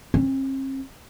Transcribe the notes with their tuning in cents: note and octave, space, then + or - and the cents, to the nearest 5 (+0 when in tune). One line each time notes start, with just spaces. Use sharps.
C4 +45